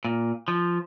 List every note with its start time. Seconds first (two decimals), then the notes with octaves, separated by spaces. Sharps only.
0.05 A#2
0.48 F3